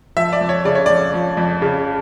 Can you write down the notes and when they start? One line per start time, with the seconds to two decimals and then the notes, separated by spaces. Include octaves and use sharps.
0.17 F3 E5
0.33 D5
0.41 F2
0.49 C#5
0.65 C#3 D5
0.75 C#5
0.86 F2 D5
1.14 F3
1.37 F2
1.62 C#3